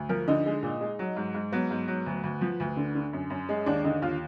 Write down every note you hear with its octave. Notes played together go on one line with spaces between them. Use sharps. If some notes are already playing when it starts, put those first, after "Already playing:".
Already playing: D2
F3 A#4
D3 D#4
G#3
A#2
G#3
F#3
G#2
G#2
F#3 B3
G#2
F#3
D2
D2
F3
D2
D3
D3
F#2
F#2
G#3
D#2 D4
D3 D#4
D#2 F4